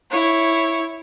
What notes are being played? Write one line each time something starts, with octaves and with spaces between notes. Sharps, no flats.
E4 C#5